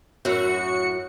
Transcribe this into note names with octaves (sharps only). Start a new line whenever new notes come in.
F#2 A2 F#4 C#7